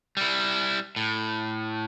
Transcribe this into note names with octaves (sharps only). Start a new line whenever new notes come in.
G3 E4
A2